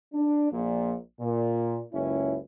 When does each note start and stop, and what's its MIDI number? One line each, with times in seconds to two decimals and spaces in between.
0.14 0.47 62
0.52 0.95 34
0.52 0.95 46
1.21 1.80 46
1.93 2.36 30
1.93 2.36 37
1.93 2.36 61
1.93 2.36 64